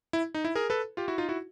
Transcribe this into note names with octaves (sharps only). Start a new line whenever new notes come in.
E4
D#4
E4
G#4 A#4
A4 B4
F4 G4
E4 F#4
D#4 F4
E4 F#4